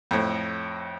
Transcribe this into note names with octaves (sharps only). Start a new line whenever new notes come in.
F2 A2